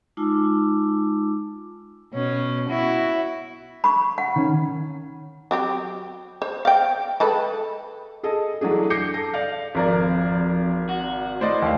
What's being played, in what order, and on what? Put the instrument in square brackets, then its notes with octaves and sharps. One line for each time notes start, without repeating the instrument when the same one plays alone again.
[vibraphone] G#3 D#4 F4 A5 D6 E6
[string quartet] B2 C#4
E4 F#4
[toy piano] B5 C#6
F#5
[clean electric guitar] D#3 C#4
[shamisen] F#3 C4 G4
C5
F5 G5
G#3 A4 B4
[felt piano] G#4 A4 D#5
E3 F#3 A3 D4 G#4
D6 G6 A#6 C7 C#7
A4 A#6
D5 F5
[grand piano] G#1 A#4 D5 [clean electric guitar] F2
[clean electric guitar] F#4
[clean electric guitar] A2 [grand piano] C5 D5 D#5
[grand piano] D#2 F5